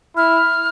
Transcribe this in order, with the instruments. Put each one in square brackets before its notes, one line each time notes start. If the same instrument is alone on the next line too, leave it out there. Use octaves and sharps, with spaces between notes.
[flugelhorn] E4 [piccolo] F6